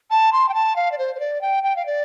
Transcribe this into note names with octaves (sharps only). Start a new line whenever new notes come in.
A5
C6
G5
A5
F5
D5
C5
C5
D5
G5
G5
F5
D5